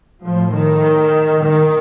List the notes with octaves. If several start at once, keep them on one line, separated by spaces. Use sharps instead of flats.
A2 F3
D#3
D#3